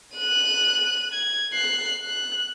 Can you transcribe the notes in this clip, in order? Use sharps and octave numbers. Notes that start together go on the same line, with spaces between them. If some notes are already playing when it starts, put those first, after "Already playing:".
F#6 D#7
G#6
F#6 C7
F#6